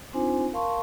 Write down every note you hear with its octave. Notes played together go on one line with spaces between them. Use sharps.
C4 D4 D#4 F4 C5 G#5
A#4 F5 A5 C6 C#6